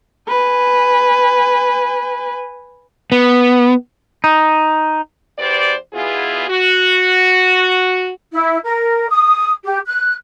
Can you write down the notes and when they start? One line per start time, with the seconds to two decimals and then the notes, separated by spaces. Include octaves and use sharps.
0.28 B4 G#5
3.12 B3
4.24 D#4
5.38 E2 G4 B4 C5 D5
5.93 B2 B3 E4 F4 G#4
6.48 F#4
8.32 E4
8.64 A#4
9.09 D#6
9.65 G4
9.87 F#6